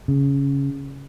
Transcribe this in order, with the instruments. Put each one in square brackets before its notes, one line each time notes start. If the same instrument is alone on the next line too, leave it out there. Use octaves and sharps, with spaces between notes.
[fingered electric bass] C#3